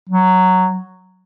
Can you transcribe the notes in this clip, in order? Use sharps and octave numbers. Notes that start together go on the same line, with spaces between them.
F#3